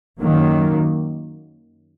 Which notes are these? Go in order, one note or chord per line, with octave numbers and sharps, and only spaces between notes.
F#2 D#3 F#3 A#3